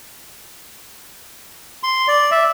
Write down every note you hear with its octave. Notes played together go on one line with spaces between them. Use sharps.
C6
D5
E5